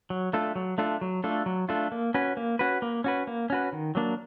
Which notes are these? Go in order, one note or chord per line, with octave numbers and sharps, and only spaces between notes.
F#3
A3 D4 F4 A4
F#3
A3 D4 F4 A4
F#3
A3 D4 F4 A4
F#3
A3 D4 F4 A4
A#3
C#4 F#4 B4
A#3
C#4 F#4 B4
A#3
C#4 F#4 B4
A#3
C#4 F#4 B4
D#3
F#3 A#3 D4